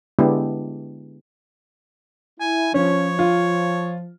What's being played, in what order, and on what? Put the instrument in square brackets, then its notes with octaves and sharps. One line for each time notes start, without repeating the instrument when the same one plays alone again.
[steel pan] D3 G#3 B3 D4 E4 G4
[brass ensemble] E4 [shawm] G#5
[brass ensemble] F3 [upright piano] C#4 [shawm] C#5
[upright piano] F4